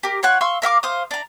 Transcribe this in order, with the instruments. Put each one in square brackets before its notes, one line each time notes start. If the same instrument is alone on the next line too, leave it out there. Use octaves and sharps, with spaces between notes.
[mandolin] G4 A#4
F4 C#5 F#5 F#6
F5 C6 C#6 E6
A#4 E5 F5 D6
C5 F5 D#6
D4 A#5